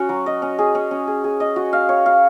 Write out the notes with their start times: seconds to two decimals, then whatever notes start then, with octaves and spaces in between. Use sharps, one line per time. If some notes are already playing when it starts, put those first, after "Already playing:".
Already playing: C#4 F#4
0.09 F#3
0.26 D#5
0.42 C#4
0.59 G#4
0.75 C#4
0.91 C#4
1.07 G#4
1.24 G#4
1.40 D#5
1.56 F#4
1.73 F5
1.89 C#5
2.06 F5